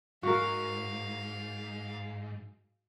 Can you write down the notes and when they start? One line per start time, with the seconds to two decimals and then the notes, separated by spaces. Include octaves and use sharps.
0.23 G#2 F#4 A#4 F5